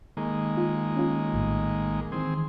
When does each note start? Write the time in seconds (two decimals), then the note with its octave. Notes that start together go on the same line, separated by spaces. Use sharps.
0.17 D#3 G#3 A#3
0.57 F4
0.97 C#4 F4
1.33 A#1 A2
2.12 D#3 E3 C4 G#4